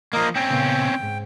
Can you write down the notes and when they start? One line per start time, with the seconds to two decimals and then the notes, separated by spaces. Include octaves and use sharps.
0.13 F3 A#3 A#4 D#5
0.36 C4 C#4 G5
0.50 A#2 C#3 B3
0.99 D2 G#2